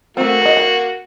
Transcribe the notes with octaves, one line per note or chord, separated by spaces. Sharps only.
A3 A#3 C4 F#4
B4 D#5
F#5